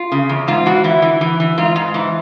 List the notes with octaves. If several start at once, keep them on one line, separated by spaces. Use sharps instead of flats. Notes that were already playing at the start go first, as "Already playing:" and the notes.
Already playing: F4
C#3
E2
G#2 F4
E3 F#4
E3 E4
E3
E3
E3
G#2 F4
G#2
E3